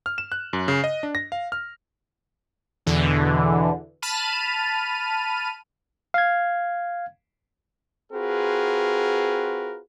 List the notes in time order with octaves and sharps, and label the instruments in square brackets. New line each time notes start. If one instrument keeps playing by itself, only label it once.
[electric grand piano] F6
E7
F#6
F#2
C#3
D#5
D4
A#6
F5
F6
[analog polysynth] E2 B2 D3 E3
A5 B5 F6 D#7
[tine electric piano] F5 G#6
[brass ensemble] C4 F4 F#4 G#4 A#4 B4